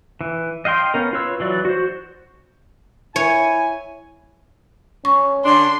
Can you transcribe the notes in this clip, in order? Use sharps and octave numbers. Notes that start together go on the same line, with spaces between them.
E3
D#5 F5 G5 C6
B3 C#4 A#4
F4 B4 C#5 E6
E3 F#3 D5
F#4 C5
E4 C#5 G#5
C#4 C#6
D3 D4 C6